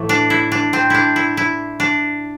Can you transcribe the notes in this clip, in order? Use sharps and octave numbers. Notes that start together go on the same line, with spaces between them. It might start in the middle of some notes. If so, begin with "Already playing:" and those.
Already playing: A2 E3 A3
D4
E4
D4
C4
D4 E4
E4
E4
D4